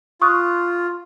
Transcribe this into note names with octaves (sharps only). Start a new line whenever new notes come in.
F4 C#6 D#6 F#6